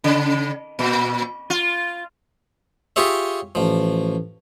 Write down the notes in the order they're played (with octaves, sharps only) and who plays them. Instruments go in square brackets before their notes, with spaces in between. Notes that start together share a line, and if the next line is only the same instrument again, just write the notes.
[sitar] C#3
A#2
F4
[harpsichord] F4 G4 G#4 C#5 E5
A1 F3